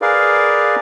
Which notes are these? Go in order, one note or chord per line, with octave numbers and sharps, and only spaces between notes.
G#4 A#4 B4 D5 F5